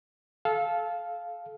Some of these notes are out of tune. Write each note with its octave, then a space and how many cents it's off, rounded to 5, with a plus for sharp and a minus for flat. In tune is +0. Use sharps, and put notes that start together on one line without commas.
A4 -20 F5 +0